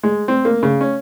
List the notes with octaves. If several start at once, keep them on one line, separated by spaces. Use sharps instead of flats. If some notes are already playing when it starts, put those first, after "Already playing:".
G#3
C4
A#3
C#3
C#4